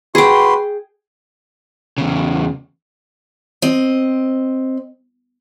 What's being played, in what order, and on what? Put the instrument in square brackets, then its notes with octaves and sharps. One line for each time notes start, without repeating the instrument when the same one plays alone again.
[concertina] F#4 B4 C6 [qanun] G#4 G5
[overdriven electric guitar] E2 C#3
[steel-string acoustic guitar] C4 D#5